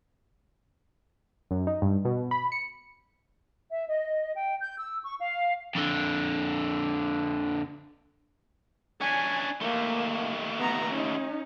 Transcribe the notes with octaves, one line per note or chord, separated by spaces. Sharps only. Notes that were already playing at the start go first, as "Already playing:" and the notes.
F#2
D#4
G2
B2
B5
C#7
E5
D#5
G5
G6
E6
C#6
F5
F2 D3
C#4 D4 G#5
D#2 A3 A#3
B3 A#5
C#4 D#4